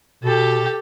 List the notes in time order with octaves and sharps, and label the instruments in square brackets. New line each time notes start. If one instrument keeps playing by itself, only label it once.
[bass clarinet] B2 [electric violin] G4 A4